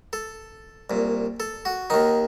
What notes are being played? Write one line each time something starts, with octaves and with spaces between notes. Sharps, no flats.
A4
C2 A#2
A4
F#4
D#2 D#3 D#4